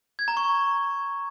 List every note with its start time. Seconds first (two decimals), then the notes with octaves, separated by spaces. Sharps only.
0.19 G#6
0.28 A#5
0.37 C#6